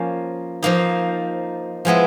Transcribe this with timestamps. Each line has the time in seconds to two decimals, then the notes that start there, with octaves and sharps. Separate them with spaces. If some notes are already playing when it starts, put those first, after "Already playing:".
Already playing: F3 A#3 C#4
0.63 F3 A#3 D#4
1.85 F3 G#3 B3 E4